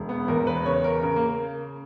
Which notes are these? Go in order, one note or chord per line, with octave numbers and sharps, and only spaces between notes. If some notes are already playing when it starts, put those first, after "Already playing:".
Already playing: E1
B3
E2 A#4
B4
C#3 C#5
A#4
C#3 A#4
A#3